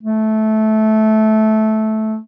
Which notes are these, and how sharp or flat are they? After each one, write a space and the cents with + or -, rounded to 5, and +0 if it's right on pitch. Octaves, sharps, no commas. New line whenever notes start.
A3 -15